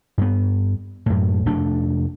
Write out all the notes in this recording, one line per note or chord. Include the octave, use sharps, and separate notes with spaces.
G2 B3
F#2 A2
F1 A3 D4